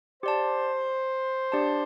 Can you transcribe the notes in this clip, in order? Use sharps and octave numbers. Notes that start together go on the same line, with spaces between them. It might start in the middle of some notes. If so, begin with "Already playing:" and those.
G4 C5 D5 A5
D4 G4 D5 A5